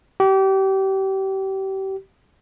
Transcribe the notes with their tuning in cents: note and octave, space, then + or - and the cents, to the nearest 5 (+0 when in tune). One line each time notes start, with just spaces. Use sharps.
G4 -30